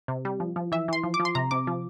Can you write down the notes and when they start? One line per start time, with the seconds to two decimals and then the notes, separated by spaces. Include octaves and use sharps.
0.08 C3
0.25 G3
0.40 F3
0.56 F3
0.72 E3 E5
0.88 E3 C6
1.04 F3
1.14 D6
1.20 F3
1.25 C6
1.35 C3 A#5
1.51 C3 D6
1.67 F3